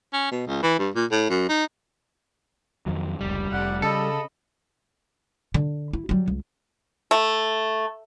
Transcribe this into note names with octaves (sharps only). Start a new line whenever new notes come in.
C#4
B2
C#2
E3
G2
A#2
A2
F#2
D#4
F2 D#3 F#3
F1 C#2 G3
F1 D5 F#5
C#3 A4 D#5 B5
D3
E4
F#3 G3
C#2
A3